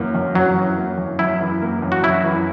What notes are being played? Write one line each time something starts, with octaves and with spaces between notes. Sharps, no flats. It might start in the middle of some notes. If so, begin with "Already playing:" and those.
Already playing: F#2 E3 A#3
F#2
F#2 F#3
E3
A#3
F#2
F#2 E4
E3
A#3
F#2
F#4
F#2 E4
E3